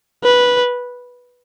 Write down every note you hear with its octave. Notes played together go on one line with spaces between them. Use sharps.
B4